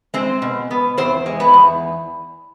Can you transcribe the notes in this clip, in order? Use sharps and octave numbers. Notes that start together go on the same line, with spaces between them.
G#3 C4 C5
B2
B3
E2 C4 C5
G#3
B3 B4
E2